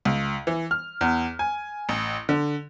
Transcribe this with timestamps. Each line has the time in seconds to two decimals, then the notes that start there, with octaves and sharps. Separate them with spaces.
0.05 C#2
0.47 E3
0.71 F6
1.01 E2
1.39 G#5
1.89 A1
2.29 D3